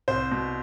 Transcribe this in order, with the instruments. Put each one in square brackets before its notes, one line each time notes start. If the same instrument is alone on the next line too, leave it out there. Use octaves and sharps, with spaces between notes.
[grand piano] C2 C5
B2